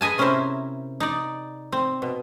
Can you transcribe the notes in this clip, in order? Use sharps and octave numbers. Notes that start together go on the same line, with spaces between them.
G#4 B4 D#5 G#5 A5
C3 C#4 E4 A#4 C5 E5
D#4 D5
C4
B2